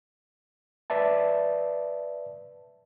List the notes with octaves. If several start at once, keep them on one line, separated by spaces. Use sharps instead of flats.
B4 D5 E5 A5